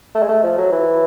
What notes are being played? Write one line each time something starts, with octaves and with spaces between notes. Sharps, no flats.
A3
G#3
A3
F3
F#3
E3